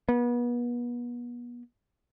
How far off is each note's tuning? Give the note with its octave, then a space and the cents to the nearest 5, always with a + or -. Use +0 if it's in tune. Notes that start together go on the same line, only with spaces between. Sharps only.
B3 -35